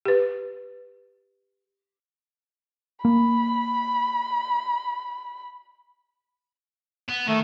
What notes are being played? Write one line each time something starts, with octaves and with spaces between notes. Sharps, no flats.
G4 B4
A#3 B5
B3
D#3 A3